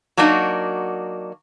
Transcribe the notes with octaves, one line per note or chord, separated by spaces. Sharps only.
F#3 A#3 D4 D#4 F#4